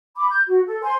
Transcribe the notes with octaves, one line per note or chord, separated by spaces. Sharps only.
B5 D6
G6
F#4
A4
C5 G#5 C6